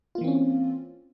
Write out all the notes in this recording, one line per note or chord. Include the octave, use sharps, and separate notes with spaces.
E3 A#3 C4 C#4 F4